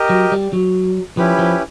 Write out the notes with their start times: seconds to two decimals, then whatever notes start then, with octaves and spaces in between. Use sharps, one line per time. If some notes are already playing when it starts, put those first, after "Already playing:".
Already playing: G4 A#4 D#5
0.10 F#3
0.32 G3
0.53 F#3
1.17 F3 C#4 E4 G4 B4
1.39 F3